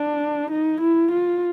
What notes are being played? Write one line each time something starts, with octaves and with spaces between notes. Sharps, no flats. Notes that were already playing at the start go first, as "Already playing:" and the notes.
Already playing: D4
D#4
E4
F4